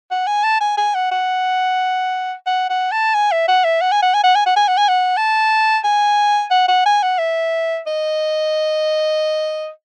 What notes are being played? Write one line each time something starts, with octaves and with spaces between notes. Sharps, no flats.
F#5
G#5
A5
G#5
G#5
F#5
F#5
F#5
F#5
A5
G#5
E5
F#5
E5
F#5
G#5
F#5
G#5
F#5
G#5
F#5
G#5
F#5
G#5
F#5
A5
G#5
F#5
F#5
G#5
F#5
E5
D#5